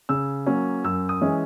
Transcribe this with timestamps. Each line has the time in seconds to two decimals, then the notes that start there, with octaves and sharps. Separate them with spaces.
0.09 C#3 E6
0.46 F#3 A#3 C#4
0.84 F#2 E6
1.09 D#6
1.21 E3 G#3 C#4